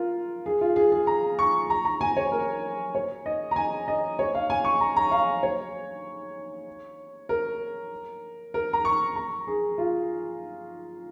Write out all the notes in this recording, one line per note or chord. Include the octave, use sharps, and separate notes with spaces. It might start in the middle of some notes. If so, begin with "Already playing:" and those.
Already playing: F4 A#4
G#4
F4
G#4
G#4
A#5
C#6
A#5
A#5
G#5
C#5
A#4
C#5
D#5
A#5
G#5
D#5
C#5
F5
G#5
C#6
A#5
A#5
F5
C#5
A#4
A#4
A#5
C#6
A#5
G#4
F4